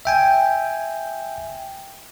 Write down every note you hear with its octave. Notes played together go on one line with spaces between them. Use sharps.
E5 G5 G#5